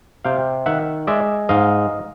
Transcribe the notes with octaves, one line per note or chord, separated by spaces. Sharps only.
C3 F5 G5
D#3 E5 F#5
G#3 D5 E5
G#2 D#5 F5